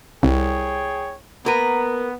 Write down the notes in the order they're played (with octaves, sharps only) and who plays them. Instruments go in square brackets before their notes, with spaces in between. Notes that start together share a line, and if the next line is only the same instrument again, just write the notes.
[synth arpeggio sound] C2 [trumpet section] G#4 C#5 G5
[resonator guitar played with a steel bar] A#3 A#4 B4 [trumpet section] B3